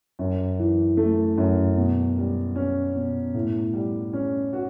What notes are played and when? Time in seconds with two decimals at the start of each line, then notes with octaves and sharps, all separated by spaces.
0.19 F#2
0.59 E3
0.97 A3
1.38 F#2
1.77 B2
2.17 G3
2.56 C#4
2.96 B2
3.34 A2
3.74 G3
4.13 C#4
4.53 F#4